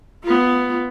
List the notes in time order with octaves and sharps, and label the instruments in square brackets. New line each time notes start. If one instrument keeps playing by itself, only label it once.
[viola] B3 F4